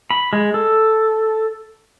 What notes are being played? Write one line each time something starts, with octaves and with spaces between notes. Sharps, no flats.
B5
G#3
A4